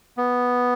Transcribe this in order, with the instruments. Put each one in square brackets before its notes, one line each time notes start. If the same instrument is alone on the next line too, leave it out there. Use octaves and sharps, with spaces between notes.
[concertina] B3